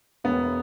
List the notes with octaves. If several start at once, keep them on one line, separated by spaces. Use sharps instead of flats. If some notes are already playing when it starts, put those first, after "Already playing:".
E1 B3